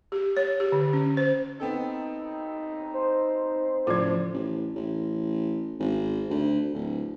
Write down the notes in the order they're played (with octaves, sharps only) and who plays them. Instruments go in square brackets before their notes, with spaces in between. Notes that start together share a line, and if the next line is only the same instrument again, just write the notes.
[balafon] G4
C#5
G4
D3
C#4
C5
[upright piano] B3 C4 A4 [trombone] D#4
[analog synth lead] C5
[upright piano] A2 C#3 G#6 [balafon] F3 F4
[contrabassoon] A1
A1
G#1
D2
D1